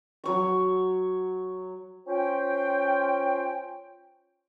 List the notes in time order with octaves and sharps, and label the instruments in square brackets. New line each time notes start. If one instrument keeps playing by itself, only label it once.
[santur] F#3 C#5 C#6
[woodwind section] C#4 F4 C5 G5